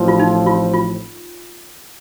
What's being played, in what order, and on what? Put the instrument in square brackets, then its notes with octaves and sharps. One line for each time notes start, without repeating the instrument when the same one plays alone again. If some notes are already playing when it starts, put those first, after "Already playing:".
Already playing: [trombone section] A1 A2 F3 C4
[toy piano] F4
D#4
F4
F4